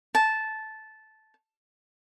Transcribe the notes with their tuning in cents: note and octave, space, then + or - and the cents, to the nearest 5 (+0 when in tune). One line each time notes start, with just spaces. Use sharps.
A5 -10